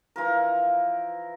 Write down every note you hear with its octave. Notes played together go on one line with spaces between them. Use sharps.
E3 F3 A#4